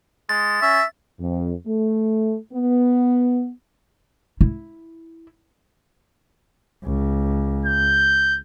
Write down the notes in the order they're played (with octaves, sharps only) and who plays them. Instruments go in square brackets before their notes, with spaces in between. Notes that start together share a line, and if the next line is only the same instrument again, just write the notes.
[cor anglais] G#3 [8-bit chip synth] A6
[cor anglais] C#4 [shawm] E5
[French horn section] F2
A3
B3
[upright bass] E4
[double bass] C#2
[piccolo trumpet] G6